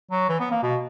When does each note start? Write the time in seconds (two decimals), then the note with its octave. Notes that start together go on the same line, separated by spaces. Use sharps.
0.11 F#3
0.29 E3
0.40 B3
0.51 A#3
0.63 B2